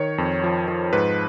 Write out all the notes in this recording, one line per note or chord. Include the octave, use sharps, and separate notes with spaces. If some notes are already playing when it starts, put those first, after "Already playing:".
Already playing: D#3 C#5
F2
F3
F3
G#2 B4